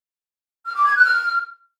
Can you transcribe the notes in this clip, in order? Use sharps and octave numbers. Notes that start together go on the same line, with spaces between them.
F6
D6
G#6
F#6
F6